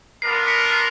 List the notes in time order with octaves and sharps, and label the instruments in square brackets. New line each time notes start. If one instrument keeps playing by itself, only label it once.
[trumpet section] B3 D4 F4 A#4 [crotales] C7
[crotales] B6 C#7
C7